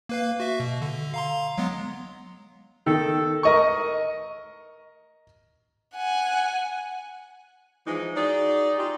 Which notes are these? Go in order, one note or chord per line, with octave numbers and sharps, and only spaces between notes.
A#3 B4 F5
F#4 E5
B2
D3
F5 A#5 C6
F#3 G#3 B3
D#3 A4
A#4 D#5 C#6
F#5 G#5
E3 F3 G#3 D#4
D#4 F#4 G#4 D5
D#4 F4 G4